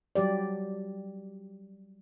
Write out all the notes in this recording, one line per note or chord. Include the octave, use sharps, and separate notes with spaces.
F#3 G3 G4 D5